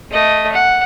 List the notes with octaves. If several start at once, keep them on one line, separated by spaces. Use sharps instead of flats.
A3 D#5
F#5